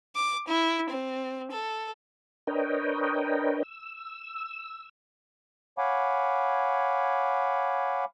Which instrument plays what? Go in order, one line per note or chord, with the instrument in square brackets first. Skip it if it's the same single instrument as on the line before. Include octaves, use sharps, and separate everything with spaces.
[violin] D6
E4
C4
A4
[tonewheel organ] D4 A#4 B4 C#5 D#5 G5
E6
[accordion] C#5 F5 F#5 G#5 B5 D6